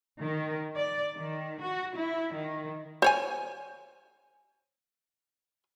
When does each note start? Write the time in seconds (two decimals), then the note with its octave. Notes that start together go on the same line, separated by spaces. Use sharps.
0.21 D#3
0.77 D5
1.15 D#3
1.62 F#4
1.96 E4
2.34 D#3
3.02 C5 C#5 G#5